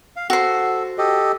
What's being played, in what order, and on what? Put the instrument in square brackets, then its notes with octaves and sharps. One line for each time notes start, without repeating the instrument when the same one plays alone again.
[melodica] F5
[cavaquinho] F#4 C5 [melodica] A4
[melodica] G4 A4 D#5